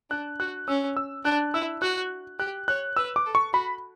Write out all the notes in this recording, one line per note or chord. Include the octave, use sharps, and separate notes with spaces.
D4 F#6
F#4 F#6
C#4 E6
E6
D4 F#6
E4 E6
F#4 F#6
G4 F#6
C#5 F#6
B4 E6
D6
A4
C#6
F#4 B5